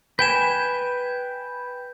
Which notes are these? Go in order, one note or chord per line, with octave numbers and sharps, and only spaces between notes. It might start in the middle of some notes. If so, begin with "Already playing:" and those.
B4 G5 G#5 G6 E7